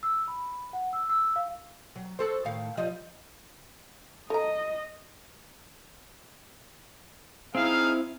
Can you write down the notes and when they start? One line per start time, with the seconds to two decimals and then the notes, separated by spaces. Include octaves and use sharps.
0.03 E6
0.28 B5
0.73 F#5
0.93 E6
1.09 E6
1.36 F5
1.96 F#3
2.19 F#4 A4 C5
2.45 A2 D#3 F5
2.77 F3 G3 D#5
4.30 A4 D#5 A#5
7.55 C4 D#4 E4 G#4 F5